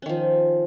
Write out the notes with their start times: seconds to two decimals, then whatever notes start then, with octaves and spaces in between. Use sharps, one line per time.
0.02 C#4
0.06 D#3
0.09 F3